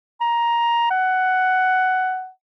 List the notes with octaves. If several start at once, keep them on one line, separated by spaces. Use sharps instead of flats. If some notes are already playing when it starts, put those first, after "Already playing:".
A#5
F#5